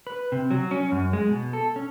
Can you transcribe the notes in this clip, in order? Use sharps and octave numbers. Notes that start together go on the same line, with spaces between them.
B4
C3
F#3
C#4
F#2
G#3
B2
A4
C#4